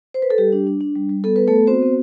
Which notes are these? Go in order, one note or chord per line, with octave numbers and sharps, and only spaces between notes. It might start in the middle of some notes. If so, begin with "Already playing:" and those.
C5
B4
A4
G3 G4
D4
D4
D4
G3
G3
B3 A4
B3 B4
A3 A4
B3
C4 F#4 C5
B3